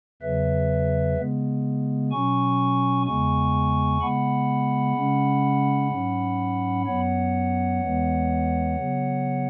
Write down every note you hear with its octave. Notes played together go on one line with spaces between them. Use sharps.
E2 C#3 F#3 B4 E5
C#3 G#3 B3
B2 F#3 C#4 G#5 C#6
E2 C#3 G#3 B3 G#5 C#6
C#3 G#3 B3 F#5 B5
C#3 G#3 C#4
G#2 F#3 C#4
F#2 F#3 B3 C#5 F#5
E2 E3 G#3 B3
C#3 F#3 B3